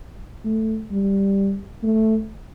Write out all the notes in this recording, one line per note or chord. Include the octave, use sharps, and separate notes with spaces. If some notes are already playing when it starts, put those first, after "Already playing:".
A3
G3
A3